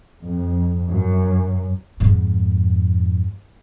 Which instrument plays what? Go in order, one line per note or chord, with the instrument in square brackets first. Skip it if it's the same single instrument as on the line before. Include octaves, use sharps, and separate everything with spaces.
[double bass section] F2
F#2
[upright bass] F2 G#2